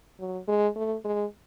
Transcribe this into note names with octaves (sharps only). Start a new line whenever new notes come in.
F#3
G#3
A3
G#3